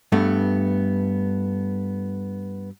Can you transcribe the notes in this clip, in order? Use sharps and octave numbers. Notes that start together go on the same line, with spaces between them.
G2 A3 B3